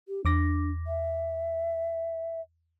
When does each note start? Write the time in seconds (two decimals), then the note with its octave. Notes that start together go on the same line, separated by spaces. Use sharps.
0.08 G4
0.25 E2 D4 D6 A#6
0.87 E5